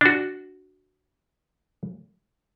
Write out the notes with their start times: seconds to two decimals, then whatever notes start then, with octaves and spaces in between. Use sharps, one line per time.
0.01 D4 F#4